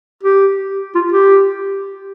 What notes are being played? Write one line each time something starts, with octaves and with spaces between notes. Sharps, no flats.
G4
F4
G4